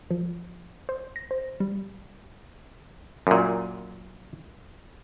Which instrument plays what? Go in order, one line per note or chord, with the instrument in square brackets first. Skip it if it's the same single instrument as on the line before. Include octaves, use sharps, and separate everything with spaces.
[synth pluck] F3
C5
A#6
C5
G3
[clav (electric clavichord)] F#2 A#2